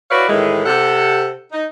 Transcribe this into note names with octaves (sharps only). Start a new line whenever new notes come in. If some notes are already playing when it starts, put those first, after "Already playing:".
E4 F#4 B4 C#5 D5 F5
A2 D#3 E3 G#3
C3 A4 F#5
D#4